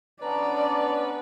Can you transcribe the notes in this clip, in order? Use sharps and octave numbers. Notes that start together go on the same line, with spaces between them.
B3 C#4 D4 B4 D5 A#5